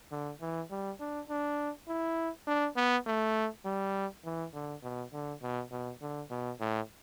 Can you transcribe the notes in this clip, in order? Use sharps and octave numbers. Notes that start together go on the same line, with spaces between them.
D3
E3
G3
D4
D4
E4
D4
B3
A3
G3
E3
D3
B2
D3
B2
B2
D3
B2
A2